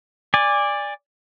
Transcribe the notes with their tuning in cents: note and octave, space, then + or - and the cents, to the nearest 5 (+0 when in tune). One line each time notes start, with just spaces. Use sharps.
D5 +0 G#5 -25